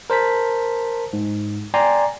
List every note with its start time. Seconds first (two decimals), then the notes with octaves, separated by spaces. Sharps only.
0.10 A#4 C5 A5 B6
1.13 G#2
1.74 D5 G5 G#5 A#5 C6